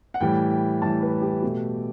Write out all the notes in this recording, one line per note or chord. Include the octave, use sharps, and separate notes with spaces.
F#5
A2 E3 G3 G5
G5
A2 E3 G3 A5
B4
G4
B2 A3